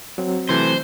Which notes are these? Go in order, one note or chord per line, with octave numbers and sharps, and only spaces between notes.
F#3 C4
C3 E3 A3 C5